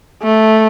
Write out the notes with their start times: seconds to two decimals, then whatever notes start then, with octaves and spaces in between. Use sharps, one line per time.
0.23 A3